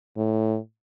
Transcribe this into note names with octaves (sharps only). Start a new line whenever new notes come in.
A2